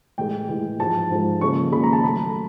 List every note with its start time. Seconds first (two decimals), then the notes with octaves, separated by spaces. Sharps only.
0.18 A2 E3 G#3 G5
0.49 A2 E3 G#3
0.79 G#2 F3 G#3 A5
1.10 G#2 F3 G#3
1.41 D#2 C#3 F3 G#3 C#6
1.72 D#2 C#3 F3 G#3 B5
1.84 A#5
1.93 A5
2.03 A#2 F#3 A3 B5